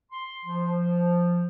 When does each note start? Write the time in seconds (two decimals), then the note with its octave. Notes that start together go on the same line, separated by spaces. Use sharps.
0.11 C6
0.45 F3